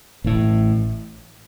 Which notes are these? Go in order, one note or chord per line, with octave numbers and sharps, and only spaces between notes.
A1 A2